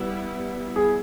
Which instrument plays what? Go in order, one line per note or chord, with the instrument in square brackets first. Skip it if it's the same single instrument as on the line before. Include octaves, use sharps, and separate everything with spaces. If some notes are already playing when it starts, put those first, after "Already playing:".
Already playing: [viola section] G3 B3 E4
[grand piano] G#4